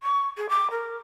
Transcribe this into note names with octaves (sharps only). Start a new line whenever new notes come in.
C#6
G#4
D6
A#4